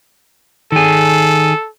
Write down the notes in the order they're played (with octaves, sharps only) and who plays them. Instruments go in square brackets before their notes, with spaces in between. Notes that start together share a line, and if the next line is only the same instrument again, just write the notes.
[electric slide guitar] D#3 G#4 [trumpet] A4